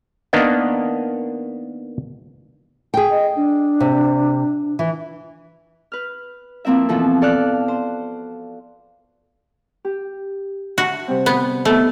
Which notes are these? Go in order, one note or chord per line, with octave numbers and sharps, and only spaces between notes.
D#3 A#3 B3 D4 D#5
G#4 G5 G#5
D#5
D4
C3
E3
B4 F6
F3 A#3 C4 E4 E5
B2 E3 F3 A4
A4 D5 F5 A5 F#6
C5
G4
F#4 E5 F#5 A5
C3 G3 C4
B3
D#3 A3 B3